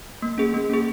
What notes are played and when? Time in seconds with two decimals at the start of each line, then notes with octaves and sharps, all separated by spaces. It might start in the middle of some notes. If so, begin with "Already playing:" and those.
0.22 A#3
0.38 C#4 G#4
0.54 A#3
0.70 C#4 G#4